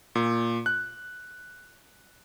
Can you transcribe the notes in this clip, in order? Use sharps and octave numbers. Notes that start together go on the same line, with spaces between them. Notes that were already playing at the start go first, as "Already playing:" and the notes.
A#2
F#6